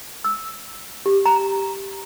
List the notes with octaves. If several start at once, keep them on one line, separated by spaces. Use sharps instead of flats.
E6
G4
A#5